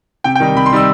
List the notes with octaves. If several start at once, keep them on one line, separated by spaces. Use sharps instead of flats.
C3 G5
G5
D#3 G3 D#4
C3 B5
C6
D#3 G3 D#4 E6